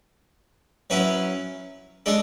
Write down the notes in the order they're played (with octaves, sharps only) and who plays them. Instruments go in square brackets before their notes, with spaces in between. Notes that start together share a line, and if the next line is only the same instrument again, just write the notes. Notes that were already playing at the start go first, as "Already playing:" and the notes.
[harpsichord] F#3 C#4 E4 B4
G#3 D4 A4